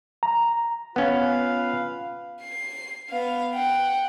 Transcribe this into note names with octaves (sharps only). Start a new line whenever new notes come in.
A#5
B3 C#4 F4 B4 F5
C7
B3 F5
F#5 G5